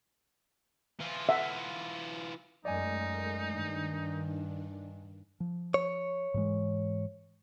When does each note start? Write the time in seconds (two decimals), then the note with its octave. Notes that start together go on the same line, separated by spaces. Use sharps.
1.00 E3 F4
1.29 E5 F#5
2.65 F#2 G#3 A3 D#4 A#4 D5 D#5 G#5
3.50 G2 D#3 D4
5.40 F3
5.74 C#5
6.34 G#2 E3 G#3